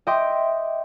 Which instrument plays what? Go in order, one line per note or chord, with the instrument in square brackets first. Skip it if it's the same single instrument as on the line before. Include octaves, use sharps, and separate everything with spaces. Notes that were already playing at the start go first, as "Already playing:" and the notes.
[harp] D#5 E5 G5 C6 D6